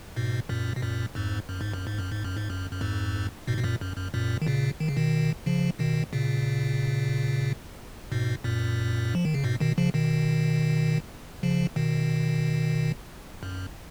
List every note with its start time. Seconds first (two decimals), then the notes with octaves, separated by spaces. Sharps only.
0.16 G#2 B2
0.49 F#2 A#2
0.76 B2
0.82 F#2 A#2
1.15 F2 G#2
1.49 F#2
1.61 G#2
1.73 F#2
1.87 G#2
1.98 F#2
2.12 G#2
2.24 F#2
2.37 G#2
2.50 F#2
2.71 F#2
2.81 F2 G#2
3.47 G#2 B2
3.58 B2
3.64 F#2 A#2
3.81 F#2
3.97 F#2
4.14 F#2 A#2
4.42 D#3
4.47 A#2 C#3
4.80 D#3
4.88 C#3
4.97 B2 D#3
5.46 C#3 F3
5.79 B2 D#3
6.13 A#2 C#3
8.12 G#2 B2
8.44 F#2 A#2
9.15 F3
9.25 D#3
9.34 C#3
9.44 G#2 B2
9.60 B2 D#3
9.78 C#3 F3
9.94 B2 D#3
11.43 C#3 F3
11.76 B2 D#3
13.43 F#2